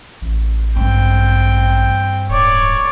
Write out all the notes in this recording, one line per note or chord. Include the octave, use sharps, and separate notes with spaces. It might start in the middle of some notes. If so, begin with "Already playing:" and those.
A1
G2 C4 G5
D1 C#5 D5